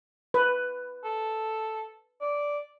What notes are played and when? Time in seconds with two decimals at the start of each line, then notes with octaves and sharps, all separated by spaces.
0.34 B4
1.04 A4
2.21 D5